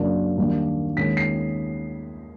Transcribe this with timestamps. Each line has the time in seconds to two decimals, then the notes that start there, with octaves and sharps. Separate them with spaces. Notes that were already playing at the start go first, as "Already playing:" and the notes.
Already playing: F#2 C#3 F#3 A#3 D4
0.37 D#2 D#3 G3 A#3 D4
0.97 D#2 D#3 G#3 C#4 B6
1.17 C7